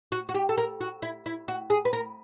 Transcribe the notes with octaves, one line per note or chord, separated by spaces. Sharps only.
F#4
F#4
G4
A4
A#4
F#4
E4
E4
F#4
G#4
B4
A#4